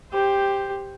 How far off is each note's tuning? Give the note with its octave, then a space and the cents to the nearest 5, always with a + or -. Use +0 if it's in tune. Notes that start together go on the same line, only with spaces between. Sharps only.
G4 +5 C5 +0